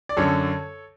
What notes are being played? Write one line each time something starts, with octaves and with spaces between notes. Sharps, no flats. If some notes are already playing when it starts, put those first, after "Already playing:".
D5
F#2 D3 A4 C#5